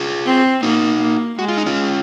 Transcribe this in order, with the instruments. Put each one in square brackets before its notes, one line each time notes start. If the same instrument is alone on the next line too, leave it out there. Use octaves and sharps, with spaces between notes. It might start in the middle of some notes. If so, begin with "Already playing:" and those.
Already playing: [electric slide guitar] F4 G#4
[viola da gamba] C4
[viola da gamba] A#3 [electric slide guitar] D#4 F#4
[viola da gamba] A#3
[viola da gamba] G#3 [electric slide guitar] F#4
[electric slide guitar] F4
D#4
C#4 F4